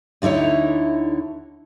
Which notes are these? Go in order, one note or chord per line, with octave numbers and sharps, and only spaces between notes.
D2 D3 D#4 E4 C#5